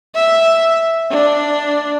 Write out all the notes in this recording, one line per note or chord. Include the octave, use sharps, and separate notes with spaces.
E5
D4